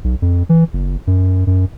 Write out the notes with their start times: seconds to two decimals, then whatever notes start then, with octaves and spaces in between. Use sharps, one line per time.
0.04 B1
0.22 F2
0.49 E3
0.73 F#1
1.07 F#2
1.47 F#2